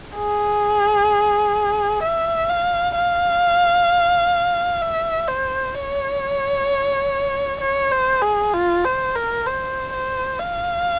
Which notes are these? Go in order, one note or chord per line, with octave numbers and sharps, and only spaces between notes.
G#4
E5
F5
F5
E5
C5
C#5
C#5
C5
G#4
F4
C5
A#4
C5
C5
F5